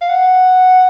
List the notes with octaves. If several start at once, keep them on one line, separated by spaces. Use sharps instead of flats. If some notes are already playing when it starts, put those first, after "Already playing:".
F5
F#5